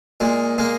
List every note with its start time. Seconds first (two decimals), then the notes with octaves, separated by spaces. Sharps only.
0.20 A#2 G#3
0.58 G#3 A#3